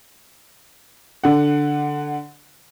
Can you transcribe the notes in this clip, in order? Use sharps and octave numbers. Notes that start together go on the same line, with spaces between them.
D3 F#5